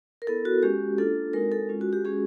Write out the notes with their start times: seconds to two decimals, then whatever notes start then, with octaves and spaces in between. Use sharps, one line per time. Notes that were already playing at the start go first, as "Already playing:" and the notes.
0.22 A#4
0.27 B3 E4 A4
0.45 F#4
0.63 G#3 C#4 F#4 G4
0.98 A#3 D4 F4 A4
1.33 G#3 C4 D#4 F#4 A#4
1.52 A4
1.69 G#3 C#4 F4
1.81 F#4
1.93 G4
2.04 G#3 C#4 F#4 G#4